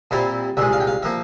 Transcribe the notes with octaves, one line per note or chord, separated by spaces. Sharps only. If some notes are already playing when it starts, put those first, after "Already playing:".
A#2 G3 C4 E4
C2 A#2 G#3 E5
F5
G5
F5
F3 A#3 E5